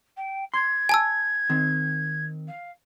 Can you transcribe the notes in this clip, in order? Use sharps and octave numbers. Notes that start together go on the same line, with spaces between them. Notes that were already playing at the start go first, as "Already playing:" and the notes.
G5
C6 G#6
G#5 A5 E6
D#3 C4
F5